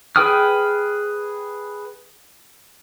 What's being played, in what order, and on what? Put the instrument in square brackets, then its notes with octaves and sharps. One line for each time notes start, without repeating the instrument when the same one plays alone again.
[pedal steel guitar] G#4 B4 G5 D#6 F6